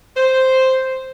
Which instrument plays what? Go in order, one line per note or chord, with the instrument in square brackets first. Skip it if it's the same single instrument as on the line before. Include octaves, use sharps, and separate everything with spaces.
[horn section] C5